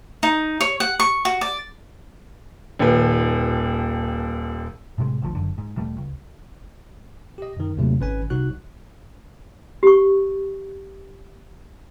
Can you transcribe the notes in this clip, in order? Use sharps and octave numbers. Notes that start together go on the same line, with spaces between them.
D#4
C#5
F#5
C#6
F#4
D5
D#1 D#2 B4
A2 C3 D#3 G#3
G#1 D2 F3
F#1 F#2 D3
G#2
E1 G3 A3
C#2
G4 D#5
F#2 D#3
D#2 G#2 C3 F#3 A3
G#1 C#4 B4 G#5
C2 D#4 F#4 F#6
G4 C#6